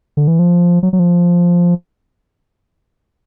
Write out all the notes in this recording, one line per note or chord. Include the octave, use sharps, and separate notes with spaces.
D3
E3
F3
F#3
F#3
F3